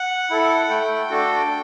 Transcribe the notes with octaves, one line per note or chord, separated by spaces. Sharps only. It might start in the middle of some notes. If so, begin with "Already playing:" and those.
Already playing: F#5
E4 A4
A3 G5
D4 F#4 A4